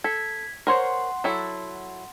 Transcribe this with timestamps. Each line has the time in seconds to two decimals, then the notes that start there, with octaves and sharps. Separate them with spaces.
0.04 A4 G#6 B6
0.67 A#4 C5 C#5 F#5 C6
1.24 F#3 E4 A4